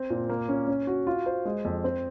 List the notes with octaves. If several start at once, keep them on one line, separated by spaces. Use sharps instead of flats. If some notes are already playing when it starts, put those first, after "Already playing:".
Already playing: C4
A#2
A#3
C#4
C#4
F#4
F4
C5
G#3
F2
C4